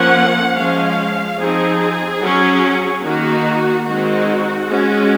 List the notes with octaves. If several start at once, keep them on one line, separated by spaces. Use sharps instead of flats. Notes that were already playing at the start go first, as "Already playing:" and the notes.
Already playing: F3 A#3 C#4 F#5
F3 G#3 C#4 F5
F3 C4 D#4 G#4
F#3 C#4
D#3 A#3 D#4 F#4
D#3 G#3 C4 D#4 F#4
G#3 C#4